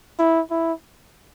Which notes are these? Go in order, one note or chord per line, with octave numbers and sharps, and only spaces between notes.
E4
E4